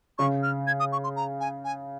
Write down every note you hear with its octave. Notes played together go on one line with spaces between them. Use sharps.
C#3 C#6
F6
G#6
D#6
C#6
C6
A#5
G#5
G#5